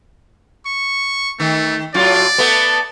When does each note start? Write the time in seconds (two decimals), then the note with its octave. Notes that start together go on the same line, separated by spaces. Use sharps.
0.66 C#6
1.40 D#3 A3
1.94 A2 F#3 F4 D5
2.38 A3 B3